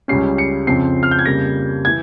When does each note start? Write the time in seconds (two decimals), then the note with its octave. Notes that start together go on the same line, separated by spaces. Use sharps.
0.08 C#2 C#3 G3 C#4 C7
0.38 C#7
0.67 F2 C#3 F3 C4 C7
1.03 F6
1.11 G6
1.19 G#6
1.25 F2 C#3 G3 A#3 A#6
1.85 E3 G#6